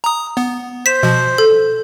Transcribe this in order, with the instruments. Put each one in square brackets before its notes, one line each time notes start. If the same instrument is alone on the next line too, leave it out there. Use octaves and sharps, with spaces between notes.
[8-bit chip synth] A#5 D#6
B3
[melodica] C5 [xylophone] B6 E7
[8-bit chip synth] B2 F3
[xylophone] A4